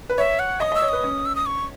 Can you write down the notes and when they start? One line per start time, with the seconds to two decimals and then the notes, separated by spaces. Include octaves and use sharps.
0.10 B4
0.18 C#5 E5
0.39 F#5
0.60 D#5 D#6
0.72 D#5
0.75 E6
0.82 C#5
0.89 B4 D#6
1.04 C#4
1.26 E6
1.36 D#6
1.46 C#6